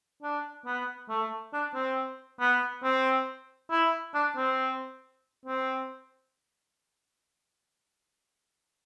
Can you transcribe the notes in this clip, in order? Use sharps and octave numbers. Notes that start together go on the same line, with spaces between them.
D4
B3
A3
D4
C4
B3
C4
E4
D4
C4
C4